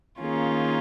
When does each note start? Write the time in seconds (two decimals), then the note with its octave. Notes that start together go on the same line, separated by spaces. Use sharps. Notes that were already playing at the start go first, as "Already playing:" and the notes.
0.20 D#3 A#3 C#4 F4 G#4